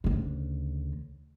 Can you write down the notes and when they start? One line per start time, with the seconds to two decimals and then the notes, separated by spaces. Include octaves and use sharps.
0.04 D2 C#3